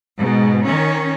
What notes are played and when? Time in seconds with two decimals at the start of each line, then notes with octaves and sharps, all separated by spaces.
0.18 G#2 B2
0.64 D#3 C#4